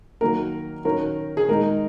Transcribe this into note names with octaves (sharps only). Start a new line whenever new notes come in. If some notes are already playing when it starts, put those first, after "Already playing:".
D#3 F#3 A#3 A#4
D#3 F#3 C#4 A#4
G#4
D#3 G#3 D#4 A#4